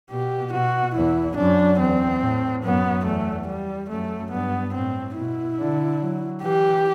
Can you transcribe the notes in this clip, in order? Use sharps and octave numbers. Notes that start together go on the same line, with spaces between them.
B2 G4
B2 F#4
E2 E4
F#2 D4
E2 C4
A2
F#2 B3
E2 A3
G3
F#2 A3
G2 B3
A2 C4
B2 E4
D3
F#3
E3 G4